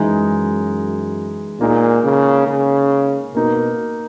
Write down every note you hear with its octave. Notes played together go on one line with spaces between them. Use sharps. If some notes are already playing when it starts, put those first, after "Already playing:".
Already playing: F#2 E3 G#3 D#4
A#2 A#3 D#4 G#4
C#3
C#3
B2 A#3 D#4 A#4